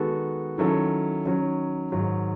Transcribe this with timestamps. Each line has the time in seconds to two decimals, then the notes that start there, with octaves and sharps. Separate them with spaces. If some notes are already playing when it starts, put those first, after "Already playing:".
Already playing: D#3 G#3 B3 F#4 A4
0.58 D#3 F#3 C#4 E4 A4
1.26 D#3 F#3 C#4
1.92 G#2 D#3 F#3